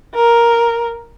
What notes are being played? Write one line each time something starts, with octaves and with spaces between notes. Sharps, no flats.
A#4